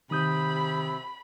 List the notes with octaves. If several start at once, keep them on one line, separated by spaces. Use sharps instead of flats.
C3 D#3 B5 D#6 G6